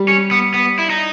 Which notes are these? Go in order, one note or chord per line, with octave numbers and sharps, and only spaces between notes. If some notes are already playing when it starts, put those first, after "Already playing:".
Already playing: G3
C#4
B3
B3
E4
D#4